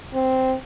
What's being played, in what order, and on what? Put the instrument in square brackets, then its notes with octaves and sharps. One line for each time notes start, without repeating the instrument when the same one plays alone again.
[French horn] C4